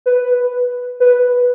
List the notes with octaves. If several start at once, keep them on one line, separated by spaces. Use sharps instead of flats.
B4
B4